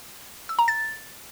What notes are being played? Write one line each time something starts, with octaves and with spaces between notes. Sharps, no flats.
E6
A#5
A6